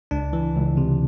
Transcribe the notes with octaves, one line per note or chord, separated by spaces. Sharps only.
C#2 D4
E3
C#2
C3